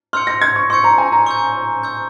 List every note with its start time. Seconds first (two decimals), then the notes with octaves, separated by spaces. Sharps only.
0.13 C6 E6 F6 G6 C#7
0.27 A#6
0.42 G#6
0.56 C#6
0.70 C6 C#6 E6 G6 C#7
0.84 A#5
0.98 G#5
1.12 A#5
1.27 C#6 E6 G6
1.83 C#6 E6 G6